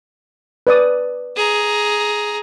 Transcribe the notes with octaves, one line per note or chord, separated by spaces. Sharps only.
B4 D5 D#6
G#4 A#5